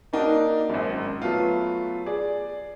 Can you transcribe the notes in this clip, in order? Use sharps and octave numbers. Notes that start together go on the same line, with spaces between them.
A#3 D4 D#4 F#4 A#4
G#1 F#2
F#3 A3 B3 F4
G#4 D5